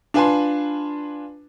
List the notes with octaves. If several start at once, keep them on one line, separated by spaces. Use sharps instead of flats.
D4 F4 B4 G#5 A5 C6